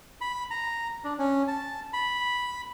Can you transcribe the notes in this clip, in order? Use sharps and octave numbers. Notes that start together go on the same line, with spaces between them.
B5
A#5
D4
C#4
A5
B5